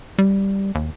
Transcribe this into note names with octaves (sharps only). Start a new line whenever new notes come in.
G3
D#2